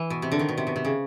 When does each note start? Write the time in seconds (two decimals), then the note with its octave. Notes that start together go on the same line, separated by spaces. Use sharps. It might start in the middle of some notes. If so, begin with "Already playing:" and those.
Already playing: E3
0.10 B2
0.22 C3
0.32 D3
0.39 D#3
0.49 B2
0.57 C3
0.67 B2
0.76 C3
0.85 C#3